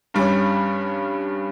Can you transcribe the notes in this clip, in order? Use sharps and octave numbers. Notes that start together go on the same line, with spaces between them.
G2 G3 C#4